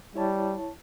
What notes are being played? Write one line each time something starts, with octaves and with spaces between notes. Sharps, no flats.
G3 E4 C#5 A5